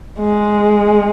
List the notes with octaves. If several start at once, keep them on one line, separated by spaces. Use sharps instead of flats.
G#3